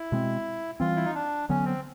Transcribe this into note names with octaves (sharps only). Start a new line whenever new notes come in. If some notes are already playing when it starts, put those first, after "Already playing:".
Already playing: E4
B2 G#3 C4
E3 G3 C4 F4
E4
D#4
D4
D3 F#3 B3 C#4
C4